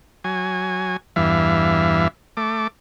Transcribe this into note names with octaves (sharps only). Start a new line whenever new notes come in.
F#3 G#5
E2 G2 E3 E5 F5
A3 D6